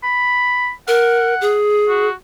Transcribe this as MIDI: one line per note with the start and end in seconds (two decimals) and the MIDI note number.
0.03 0.72 83
0.88 1.34 70
0.88 1.57 78
1.41 2.08 68
1.88 2.13 66